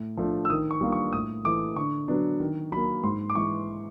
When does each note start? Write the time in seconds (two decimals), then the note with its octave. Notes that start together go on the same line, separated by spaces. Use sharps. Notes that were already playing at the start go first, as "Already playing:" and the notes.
Already playing: A2
0.17 F3 A3 D4
0.45 E6
0.50 D#3 D#6
0.71 C#6
0.81 G3 A#3 D4 F4
0.92 C#6
1.13 A2 D#6
1.45 E3 A3 D6
1.76 D3 C#6
2.08 F#3 B3 D4
2.40 D#3
2.72 F#3 A#3 B5
3.03 G#2 C6
3.30 D6
3.35 E3 G#3 C#6